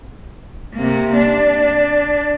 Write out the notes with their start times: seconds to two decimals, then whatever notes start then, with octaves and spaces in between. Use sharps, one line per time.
0.75 C3 A#3
1.17 D4